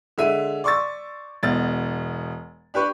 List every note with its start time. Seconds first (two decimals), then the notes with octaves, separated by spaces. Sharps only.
0.18 D3 G#3 E5 D#7
0.64 D5 C6 C#6 E6 A6
1.43 E1 B2 A6
2.74 D4 G4 B4 C#6